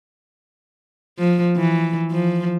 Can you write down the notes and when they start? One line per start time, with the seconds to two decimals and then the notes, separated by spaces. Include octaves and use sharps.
1.18 F3
1.57 E3
2.12 F3